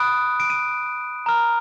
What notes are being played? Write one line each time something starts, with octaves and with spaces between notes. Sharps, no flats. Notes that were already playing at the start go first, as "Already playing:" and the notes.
Already playing: B5 D#6 F#6 D7
D7
D#7
A#5 F6